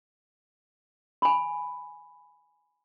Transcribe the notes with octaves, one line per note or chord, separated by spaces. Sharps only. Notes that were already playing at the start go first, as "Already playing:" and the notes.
G#5 B5